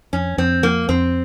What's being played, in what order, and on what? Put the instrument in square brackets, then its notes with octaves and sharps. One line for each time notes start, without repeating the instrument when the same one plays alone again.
[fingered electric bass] F2 [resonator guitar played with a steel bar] C#4
[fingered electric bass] F2 [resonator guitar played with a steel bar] C4
[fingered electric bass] F3 [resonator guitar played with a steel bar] A#3
[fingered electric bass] F2 [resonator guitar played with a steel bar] C4